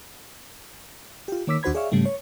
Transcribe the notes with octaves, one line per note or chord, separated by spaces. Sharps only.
F4 G4
D#3 A#3 C#5 D6 E6 B6
D#2 D4 F#4 C5 B5 G#6
G#4 C#5 D5 E5 F5 C#6
G#2 C#3 G3 A3
C#5